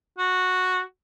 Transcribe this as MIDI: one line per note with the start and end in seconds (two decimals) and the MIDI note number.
0.18 0.81 66